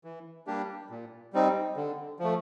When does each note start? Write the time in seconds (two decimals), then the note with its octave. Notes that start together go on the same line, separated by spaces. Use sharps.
0.04 E3
0.47 G3 A#3 D4 G4
0.90 A#2
1.33 G3 C4 D#4
1.77 D3
2.19 F3 A3